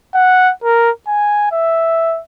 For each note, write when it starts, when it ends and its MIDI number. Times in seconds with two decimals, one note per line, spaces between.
0.15 0.51 78
0.64 0.91 70
1.08 1.47 80
1.52 2.20 76